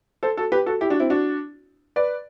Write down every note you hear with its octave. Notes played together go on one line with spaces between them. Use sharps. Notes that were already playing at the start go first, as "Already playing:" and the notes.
A4 C5
F#4 A4
G4 B4
F#4 A4
E4 G4
D4 F#4
C4 E4
D4 F#4
B4 D5